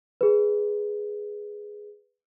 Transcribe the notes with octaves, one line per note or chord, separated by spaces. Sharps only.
G#4 B4